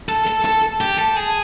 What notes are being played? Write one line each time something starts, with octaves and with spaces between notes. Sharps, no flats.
A4
A4
A4
G4
A4
G#4